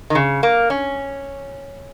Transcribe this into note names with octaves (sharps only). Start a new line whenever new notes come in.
D#3
C#3
A#3
C#4